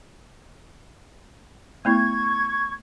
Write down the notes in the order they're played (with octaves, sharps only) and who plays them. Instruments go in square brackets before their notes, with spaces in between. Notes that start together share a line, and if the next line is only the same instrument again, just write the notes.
[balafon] A3 B3 E4 [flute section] C#6 G#6